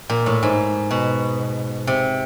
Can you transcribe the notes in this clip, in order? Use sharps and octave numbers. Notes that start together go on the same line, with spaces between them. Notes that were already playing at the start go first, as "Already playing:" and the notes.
A#2
A2
G#2
B2
C3